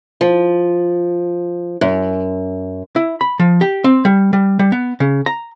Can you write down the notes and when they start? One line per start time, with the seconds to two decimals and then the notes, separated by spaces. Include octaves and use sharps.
0.21 F3
1.81 F#2
2.96 E4
3.21 B5
3.39 F3
3.61 G4
3.84 C4
4.05 G3
4.33 G3
4.59 G3
4.72 B3
5.00 C#3
5.26 A#5